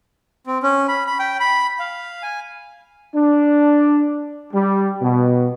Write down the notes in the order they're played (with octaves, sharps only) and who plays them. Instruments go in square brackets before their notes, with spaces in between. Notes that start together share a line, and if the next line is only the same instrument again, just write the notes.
[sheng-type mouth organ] C4
C#4
B5
B5
G5
B5
F5
G#5
[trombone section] D4
G3
B2